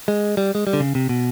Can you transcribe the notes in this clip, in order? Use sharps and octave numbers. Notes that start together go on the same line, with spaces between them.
G#3
G3
G#3
G3
D3
C#3
C3
B2